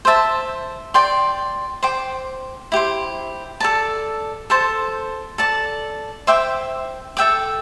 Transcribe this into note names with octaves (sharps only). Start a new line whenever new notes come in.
C5 E5 A5
D5 G5 C6
C5 G5 D6
E4 G4 C5
A4 D5 A5
A4 C5 A5
A4 D5 A5
C5 E5 G5 D6
A4 E5 G5 D6